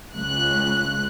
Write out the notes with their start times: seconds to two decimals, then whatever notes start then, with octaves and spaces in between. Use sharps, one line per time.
0.15 C#2 F#6